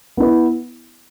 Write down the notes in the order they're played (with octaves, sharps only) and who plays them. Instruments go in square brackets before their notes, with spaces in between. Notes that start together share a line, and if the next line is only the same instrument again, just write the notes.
[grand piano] B3 E4 B4